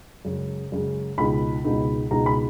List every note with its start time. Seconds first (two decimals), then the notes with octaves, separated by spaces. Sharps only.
0.25 F#2 C#3 G#3
0.72 F#2 C#3 G#3
1.18 C#2 B2 G#3 D#4 B5
1.64 C#2 B2 G#3 D#4
2.11 C#2 B2 G#3 D#4 A#5
2.26 B5